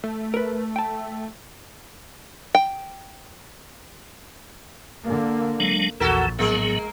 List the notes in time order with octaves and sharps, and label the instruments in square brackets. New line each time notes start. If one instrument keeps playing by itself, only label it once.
[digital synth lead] A3
[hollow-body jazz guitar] A#4 B4
G5 A5
[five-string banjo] G5
[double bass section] D3 A#3
[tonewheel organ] F#3 G#3 D4
[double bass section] A#1 [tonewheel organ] E2 E3 [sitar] F#4 A4 A#4
[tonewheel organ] A2 F#3 B3 [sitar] G#3 A#3